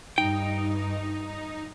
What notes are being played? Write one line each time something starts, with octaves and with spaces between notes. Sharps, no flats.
G2 D#4 G5